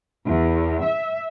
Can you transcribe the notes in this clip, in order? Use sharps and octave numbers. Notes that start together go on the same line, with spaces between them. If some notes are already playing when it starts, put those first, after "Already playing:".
E2
E5